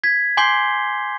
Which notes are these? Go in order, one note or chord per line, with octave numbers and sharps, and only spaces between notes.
G#6 B6
G#5 C6 D6 G6 C7 G7